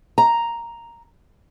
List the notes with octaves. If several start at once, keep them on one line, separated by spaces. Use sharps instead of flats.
A#5